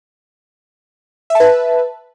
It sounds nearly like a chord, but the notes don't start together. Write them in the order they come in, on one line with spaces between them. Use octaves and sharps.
E5 A5 B4